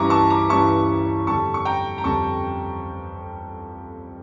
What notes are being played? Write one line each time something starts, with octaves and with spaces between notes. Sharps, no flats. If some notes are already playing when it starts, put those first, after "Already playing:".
Already playing: G2 E3 G3 C#4 E4 A#5 C#6 D6
A5 C#6
A#5 D6
G2 E3 G3 C#4 E4 A5 C#6
F2 D3 G3 A5 C#6
C#6
G5 A#5
A#5
F2 D3 G3 A5 C#6